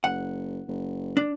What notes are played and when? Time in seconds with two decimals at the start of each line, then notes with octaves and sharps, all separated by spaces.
0.04 F#1 F#5
0.68 F#1
1.17 D4